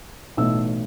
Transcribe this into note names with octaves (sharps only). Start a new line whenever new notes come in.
B1 A2 E3 A3 E6